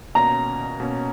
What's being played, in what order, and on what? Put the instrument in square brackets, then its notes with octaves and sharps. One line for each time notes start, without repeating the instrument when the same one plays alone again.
[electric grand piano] B2 A#3 C#4 [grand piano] A#5
[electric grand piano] B2 A#3 C#4